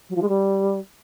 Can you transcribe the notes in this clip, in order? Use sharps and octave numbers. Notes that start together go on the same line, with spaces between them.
F#3
F3
G#3
G3